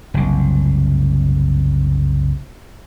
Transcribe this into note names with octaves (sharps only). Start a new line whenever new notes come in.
F#1 C2